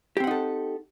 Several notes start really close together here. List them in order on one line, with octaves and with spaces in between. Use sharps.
G4 C4 F#5 D#4 A4